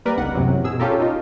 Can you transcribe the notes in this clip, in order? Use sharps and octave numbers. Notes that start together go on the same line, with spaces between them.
G3 A#3 A#4 B4 D5
G1 C#2 D#3 F#5
F#2 C3 E3 F#3
B2 G#4 E6
C#4 F4 G4 A4 A#4
D#4 F4